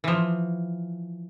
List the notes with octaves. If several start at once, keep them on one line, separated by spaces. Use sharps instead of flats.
E3 F3